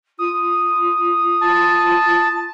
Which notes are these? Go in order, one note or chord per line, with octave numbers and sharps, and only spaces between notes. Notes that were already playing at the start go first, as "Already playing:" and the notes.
F4 D#6
F4 A5